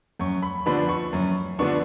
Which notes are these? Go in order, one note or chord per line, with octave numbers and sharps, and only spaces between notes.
F#2 C#6
B5
D3 F3 B3 D4 B5
C#6
F#2
D3 F3 B3 D4 C#6